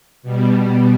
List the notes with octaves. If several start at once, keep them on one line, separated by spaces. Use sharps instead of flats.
B2 G3